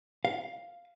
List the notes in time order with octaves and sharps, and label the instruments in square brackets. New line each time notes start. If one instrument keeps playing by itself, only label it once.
[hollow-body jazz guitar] F5